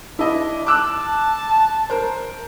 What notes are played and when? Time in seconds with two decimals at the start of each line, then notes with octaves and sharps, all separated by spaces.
0.19 D4 E4 D#5
0.67 A5 D6 E6 F#6
1.90 A#4 C5